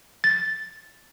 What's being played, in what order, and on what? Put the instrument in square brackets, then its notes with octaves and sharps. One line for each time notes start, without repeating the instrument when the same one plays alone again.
[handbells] A6